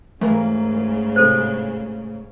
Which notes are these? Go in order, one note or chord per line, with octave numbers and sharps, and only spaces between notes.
G#2 C#3 E3 A3 A#3 A#4
A2 C3 A4 C5